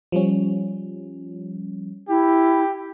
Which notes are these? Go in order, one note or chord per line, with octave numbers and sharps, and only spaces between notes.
F3 G3 C#4
E4 G4